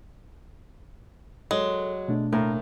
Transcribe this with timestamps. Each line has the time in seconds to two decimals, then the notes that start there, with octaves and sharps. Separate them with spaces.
1.51 F#3 G#3 A4
2.08 B2 A3 D4
2.33 A2 A#3 A#4